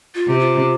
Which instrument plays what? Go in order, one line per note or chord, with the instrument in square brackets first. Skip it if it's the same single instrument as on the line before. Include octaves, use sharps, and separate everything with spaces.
[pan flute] F4
[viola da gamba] C3
[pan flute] F4